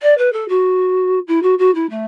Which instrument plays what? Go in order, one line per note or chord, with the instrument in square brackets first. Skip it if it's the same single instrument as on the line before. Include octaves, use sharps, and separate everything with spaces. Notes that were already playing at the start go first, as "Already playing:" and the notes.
[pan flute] D5
B4
A4
F#4
E4
F#4
F#4
E4
A3